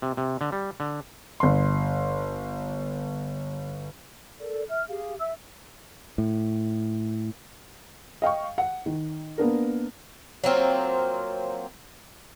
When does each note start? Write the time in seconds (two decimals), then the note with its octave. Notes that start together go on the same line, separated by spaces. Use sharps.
0.02 C3
0.17 C3
0.41 D3
0.52 G3
0.80 D3
1.40 G1 C6
4.41 A4 A#4 D5
4.68 E5 F6
4.88 G4 G#4 F5
5.19 E5 E6
6.18 A2
8.22 D#5 F5 G5 C#6
8.58 F#5
8.86 D#3
9.38 A#3 B3 D4 A#4
10.44 F#3 A#3 C4 F4